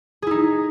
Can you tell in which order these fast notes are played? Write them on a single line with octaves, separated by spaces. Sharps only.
G#4 E4 D#4